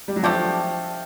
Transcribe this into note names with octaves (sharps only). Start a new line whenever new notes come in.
G3
F#3
F3 A3 D4 G4